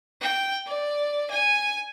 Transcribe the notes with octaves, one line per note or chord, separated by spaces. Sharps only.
G5
D5
G#5